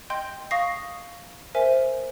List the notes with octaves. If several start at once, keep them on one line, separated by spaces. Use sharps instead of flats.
D#5 G5 C6 G6
F5 C#6 D#6 A#6 C7
A#4 C5 E5 G#5